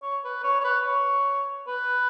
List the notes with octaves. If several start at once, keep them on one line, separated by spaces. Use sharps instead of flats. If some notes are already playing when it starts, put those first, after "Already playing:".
C#5
B4
C#5
C#5
B4
C#5
B4